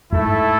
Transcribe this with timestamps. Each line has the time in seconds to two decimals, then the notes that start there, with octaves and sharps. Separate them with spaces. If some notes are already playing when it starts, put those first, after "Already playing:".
0.12 G#2 A3 E4 A4 E5